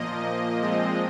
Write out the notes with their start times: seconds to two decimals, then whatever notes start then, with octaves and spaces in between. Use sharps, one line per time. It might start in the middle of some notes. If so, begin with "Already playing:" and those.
Already playing: A#2 F3 A#3 D#5
0.60 A#2 F3 G#3 C4 D#5